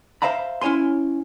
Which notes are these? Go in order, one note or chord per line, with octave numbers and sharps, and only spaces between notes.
C5 E5 F5 A#5 B5
C#4 E4 C#5 G#5 C6